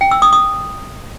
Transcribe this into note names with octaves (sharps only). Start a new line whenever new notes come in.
G5
E6
D#6
D#6